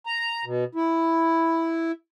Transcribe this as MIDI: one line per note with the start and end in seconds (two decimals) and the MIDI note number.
0.06 0.44 82
0.45 0.64 47
0.75 1.92 64